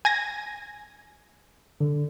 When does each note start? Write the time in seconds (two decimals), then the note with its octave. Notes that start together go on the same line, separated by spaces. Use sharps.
0.05 G#5 G#6 A#6
1.81 D3